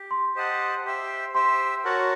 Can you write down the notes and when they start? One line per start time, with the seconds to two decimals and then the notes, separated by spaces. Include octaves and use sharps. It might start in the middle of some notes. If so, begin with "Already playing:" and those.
Already playing: G4
0.11 C6
0.35 G4 C5 D#5 F#5 A5
0.85 G4 C5 E5 G5
1.35 G4 C5 E5 G5 C6
1.84 F#4 A#4 C#5 F#5 A5